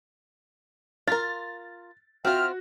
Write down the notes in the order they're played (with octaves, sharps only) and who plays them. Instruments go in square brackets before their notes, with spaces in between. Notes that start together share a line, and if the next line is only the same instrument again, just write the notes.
[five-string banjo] F4 A#4 [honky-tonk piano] A6
[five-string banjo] C4 F4 [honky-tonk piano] F#4 [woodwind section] E5 G5 F6